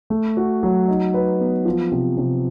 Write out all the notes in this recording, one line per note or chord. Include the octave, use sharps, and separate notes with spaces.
A3
F#4
F#3
D#4
B4
B3
F3
C3
C3